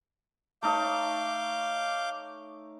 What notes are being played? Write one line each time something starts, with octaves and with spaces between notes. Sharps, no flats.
A3 D#4 C#5 F5 D6 G6